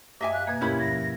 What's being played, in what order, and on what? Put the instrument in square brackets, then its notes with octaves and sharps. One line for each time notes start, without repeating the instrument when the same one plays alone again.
[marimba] F#2 [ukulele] D#5 E5 G#5 [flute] D6
[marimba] F5 [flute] F#6
[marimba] G2 B2 A#3 [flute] G#6
[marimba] D#2 G4 A#4 [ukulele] C#4 E4 B5
[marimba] F3 [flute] A#6